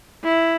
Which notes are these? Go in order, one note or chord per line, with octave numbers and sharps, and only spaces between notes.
E4